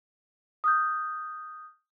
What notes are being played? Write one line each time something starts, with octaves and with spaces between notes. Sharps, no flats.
D#6 F6 G6